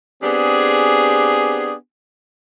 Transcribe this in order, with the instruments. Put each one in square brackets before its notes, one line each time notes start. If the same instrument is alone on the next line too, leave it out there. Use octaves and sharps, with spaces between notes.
[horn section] B3 C4 D4 G4 G#4